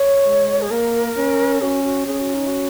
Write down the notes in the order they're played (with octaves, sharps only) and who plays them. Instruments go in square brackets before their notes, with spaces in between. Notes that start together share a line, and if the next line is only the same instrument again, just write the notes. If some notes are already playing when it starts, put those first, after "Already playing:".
Already playing: [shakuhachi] C#5
[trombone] G#3
[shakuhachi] G#4
[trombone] A#3 [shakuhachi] A#4
[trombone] C#4
[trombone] C#4 [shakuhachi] F#4
[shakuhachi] F#4
[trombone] C#4 [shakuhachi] G#4
[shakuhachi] F#4
D#4
F#4